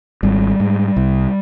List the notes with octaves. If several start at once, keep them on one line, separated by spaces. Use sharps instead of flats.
G#1 G3
G#2
C2